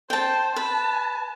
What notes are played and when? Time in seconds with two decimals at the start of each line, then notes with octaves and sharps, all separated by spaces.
0.10 C5 G5 A5
0.56 B4 A5